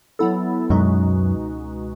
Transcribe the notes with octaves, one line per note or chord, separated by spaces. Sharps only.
F#3 B3 E4 A4
C#2 F#2 B2 G#3 D#4 F#4